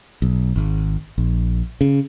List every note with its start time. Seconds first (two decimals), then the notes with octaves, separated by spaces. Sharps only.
0.22 B1
0.56 G#1
1.18 A#1
1.81 C#3